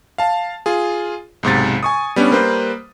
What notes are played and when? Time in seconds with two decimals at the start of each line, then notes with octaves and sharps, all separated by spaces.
0.18 F5 A5
0.66 F4 G#4
1.43 B1 G#2 C3 A6
1.83 G#5 C#6 D#6
2.16 G3 B3 C#4 D4
2.31 G3 A#3 B4 C5